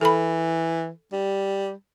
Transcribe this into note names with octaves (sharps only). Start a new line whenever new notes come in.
E3 A4 B5
G3